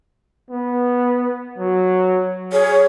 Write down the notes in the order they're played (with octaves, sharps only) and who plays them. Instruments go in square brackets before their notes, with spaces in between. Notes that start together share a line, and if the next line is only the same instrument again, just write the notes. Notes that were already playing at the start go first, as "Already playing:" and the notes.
[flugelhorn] B3
F#3
[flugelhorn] G#4 [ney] C#5